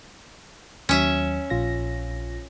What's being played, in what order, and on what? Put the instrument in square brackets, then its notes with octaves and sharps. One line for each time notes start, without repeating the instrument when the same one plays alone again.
[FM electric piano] D#2 F#3 [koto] C#4 E5
[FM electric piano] A#1 F4 A#6